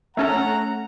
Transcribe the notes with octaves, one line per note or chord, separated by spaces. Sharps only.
A3 C#4 A4 F#5 A#5